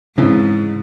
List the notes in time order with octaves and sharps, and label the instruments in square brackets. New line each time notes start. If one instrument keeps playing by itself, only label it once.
[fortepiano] F2 E3 [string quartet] G#2 [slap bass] C#3